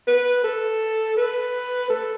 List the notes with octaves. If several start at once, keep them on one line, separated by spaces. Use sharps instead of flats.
B4
A4
B4
A4